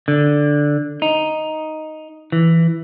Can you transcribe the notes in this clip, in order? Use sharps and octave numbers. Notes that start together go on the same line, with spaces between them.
D3
D#4
E3